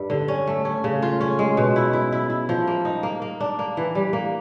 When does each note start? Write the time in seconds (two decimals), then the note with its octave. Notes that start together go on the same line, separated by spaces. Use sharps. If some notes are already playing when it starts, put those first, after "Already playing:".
Already playing: G2 G3
0.10 D3
0.28 C#4
0.47 A3
0.65 C#4
0.84 C#3
1.02 F4
1.21 C#4
1.39 G#3
1.57 B2
1.76 E4
1.93 E4
2.12 E4
2.30 E4
2.49 F3
2.67 A#3
2.85 D#4
3.03 A#3
3.22 A#3
3.40 D4
3.59 A#3
3.77 E3
3.95 G3
4.13 A#3